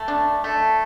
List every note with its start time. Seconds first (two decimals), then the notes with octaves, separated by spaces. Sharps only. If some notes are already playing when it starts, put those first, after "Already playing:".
Already playing: A3
0.08 D4
0.44 A3